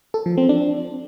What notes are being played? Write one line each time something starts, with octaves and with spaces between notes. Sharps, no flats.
A4
F3
C4
D4